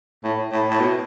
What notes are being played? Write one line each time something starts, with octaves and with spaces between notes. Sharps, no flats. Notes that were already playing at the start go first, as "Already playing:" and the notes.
A2
A2
A2
B2